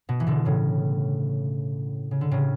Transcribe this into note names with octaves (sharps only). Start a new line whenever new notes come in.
B2
E3
B2 D3
A2 C#3
C#3
D3
A2 C#3